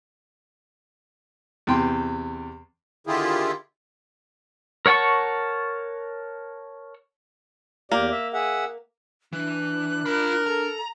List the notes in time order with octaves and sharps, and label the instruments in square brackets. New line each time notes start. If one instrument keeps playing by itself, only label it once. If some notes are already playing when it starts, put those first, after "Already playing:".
[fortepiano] E2 C3 G5 C6
[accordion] D3 D#3 E4 F4 G4 G#4
[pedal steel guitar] A#4 C#5 F#5 A5 C#6
[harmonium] E2 G4 D5 [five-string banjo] A#3
[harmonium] E5
G#4 E5 F#5
[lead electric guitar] E3 [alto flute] D4 [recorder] F#6
[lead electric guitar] F4 B5 [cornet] A#4
[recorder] A4 [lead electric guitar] A#5